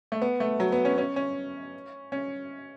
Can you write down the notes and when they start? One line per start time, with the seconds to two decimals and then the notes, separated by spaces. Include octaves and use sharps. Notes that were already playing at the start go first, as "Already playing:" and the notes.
0.12 A3
0.22 B3
0.40 A3
0.60 F#3
0.72 B3
0.85 C#4
0.98 C#4
1.16 C#4
2.12 C#4